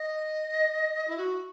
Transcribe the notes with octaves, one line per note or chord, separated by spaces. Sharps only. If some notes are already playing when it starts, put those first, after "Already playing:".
Already playing: D#5
E4
F#4